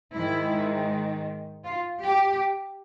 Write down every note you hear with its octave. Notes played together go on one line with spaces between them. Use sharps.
G#2 D#3 G#3 E4
F4
G4